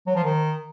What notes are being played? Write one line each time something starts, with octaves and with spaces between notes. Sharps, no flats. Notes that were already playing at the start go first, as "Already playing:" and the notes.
F#3
F3
D#3